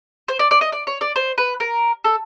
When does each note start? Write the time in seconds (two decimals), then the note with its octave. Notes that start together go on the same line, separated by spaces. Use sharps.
0.28 C5
0.39 D5
0.51 D5
0.61 D#5
0.72 D5
0.87 C#5
1.01 D5
1.16 C5
1.38 B4
1.60 A#4
2.04 A4